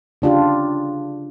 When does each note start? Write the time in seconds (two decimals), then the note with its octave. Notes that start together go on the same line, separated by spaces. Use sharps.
0.22 C#3 D4 F4 G4